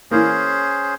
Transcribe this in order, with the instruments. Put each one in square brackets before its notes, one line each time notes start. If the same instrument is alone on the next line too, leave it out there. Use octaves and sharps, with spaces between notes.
[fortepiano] E3 A#3 [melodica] C#4 G#4 C5